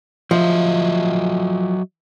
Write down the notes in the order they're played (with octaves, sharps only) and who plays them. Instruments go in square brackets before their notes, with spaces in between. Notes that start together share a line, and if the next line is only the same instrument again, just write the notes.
[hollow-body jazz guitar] F3 [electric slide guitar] F#3 D#5 E5